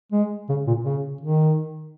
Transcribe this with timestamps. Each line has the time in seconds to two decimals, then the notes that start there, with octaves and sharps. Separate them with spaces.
0.12 G#3
0.49 C#3
0.67 A#2
0.85 C#3
1.21 D#3